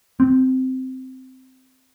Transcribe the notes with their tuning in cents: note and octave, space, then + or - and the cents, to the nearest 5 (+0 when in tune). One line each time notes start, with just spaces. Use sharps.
C4 -10